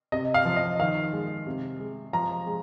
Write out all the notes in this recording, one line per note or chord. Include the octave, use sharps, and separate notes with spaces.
C3 D#5
F5
F3
D#5
D#3 F5
G#3
C3
G#3
F3 A#5
G#3